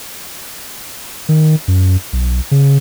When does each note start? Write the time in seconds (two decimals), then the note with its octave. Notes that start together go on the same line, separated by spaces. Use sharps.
1.29 D#3
1.68 F#2
2.13 B1
2.51 C#3